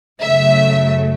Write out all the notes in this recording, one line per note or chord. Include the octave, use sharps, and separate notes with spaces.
F#2 C#3 F#3 A3 E5